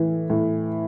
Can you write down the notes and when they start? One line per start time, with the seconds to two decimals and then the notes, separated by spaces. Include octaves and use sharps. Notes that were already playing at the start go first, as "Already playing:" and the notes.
Already playing: A2 E3
0.30 A2